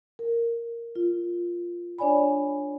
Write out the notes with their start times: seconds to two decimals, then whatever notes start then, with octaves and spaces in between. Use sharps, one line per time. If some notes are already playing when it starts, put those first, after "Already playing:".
0.19 A#4
0.96 F4
1.98 D4 C#5 D5 G#5 B5